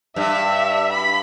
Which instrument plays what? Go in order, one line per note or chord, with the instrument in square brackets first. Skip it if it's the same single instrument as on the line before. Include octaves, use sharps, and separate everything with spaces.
[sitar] G2 [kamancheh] E5
[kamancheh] B5